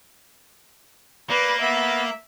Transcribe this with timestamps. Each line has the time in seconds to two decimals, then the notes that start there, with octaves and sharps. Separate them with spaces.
1.30 A#3 B4 D5
1.61 B3 E5